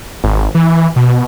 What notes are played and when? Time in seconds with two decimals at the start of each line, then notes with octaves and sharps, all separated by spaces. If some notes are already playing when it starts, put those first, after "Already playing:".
0.24 G#1
0.55 E3
0.96 B2